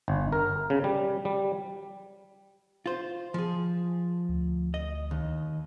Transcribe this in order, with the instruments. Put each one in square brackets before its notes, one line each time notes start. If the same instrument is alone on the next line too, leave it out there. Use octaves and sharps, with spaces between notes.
[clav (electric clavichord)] G1
A#4
C#3
G3
G3
[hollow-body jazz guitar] F4 C5
F3 G#4
[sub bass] D2
[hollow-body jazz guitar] D#5
D#2